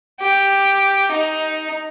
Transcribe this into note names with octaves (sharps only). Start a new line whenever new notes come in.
G4
D#4